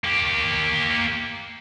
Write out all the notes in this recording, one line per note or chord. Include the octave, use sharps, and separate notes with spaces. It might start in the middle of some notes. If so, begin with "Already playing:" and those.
A#3 G4